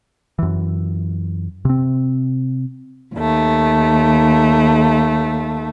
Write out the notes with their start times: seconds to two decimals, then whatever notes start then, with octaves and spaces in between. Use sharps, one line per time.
0.39 F#2 E3
1.65 C3 C4
3.14 D#2 A3